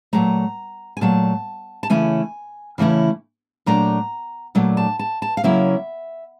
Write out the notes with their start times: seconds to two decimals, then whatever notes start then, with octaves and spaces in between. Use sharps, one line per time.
0.13 A#2 F#3 A3 A#5
0.97 G#5
1.01 A#2 F#3 A3 A5
1.83 A5
1.90 C#3 E3 A3 C#4 E4 G#5
2.78 C#3 E3 A3 C#4 E4
3.66 A#2 F#3 A3 D4 A#5
4.55 A#2 F#3 A3 D4
4.77 A5
4.99 A5
5.22 A5
5.37 F5
5.43 C#3 F#3 A#3 C#4 E4 E5